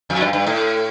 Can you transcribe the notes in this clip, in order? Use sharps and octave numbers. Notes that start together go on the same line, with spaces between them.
F2
G2
G2
A2